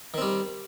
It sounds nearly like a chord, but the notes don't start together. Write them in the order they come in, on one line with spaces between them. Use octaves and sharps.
D#3 C4 G3